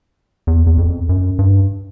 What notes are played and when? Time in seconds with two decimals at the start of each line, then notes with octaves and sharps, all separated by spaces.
0.47 E2
0.67 E2
0.78 F2
1.09 F#2
1.39 G2